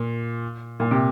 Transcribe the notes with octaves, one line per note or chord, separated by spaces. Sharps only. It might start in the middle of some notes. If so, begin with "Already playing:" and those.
Already playing: A#2
A#2
C3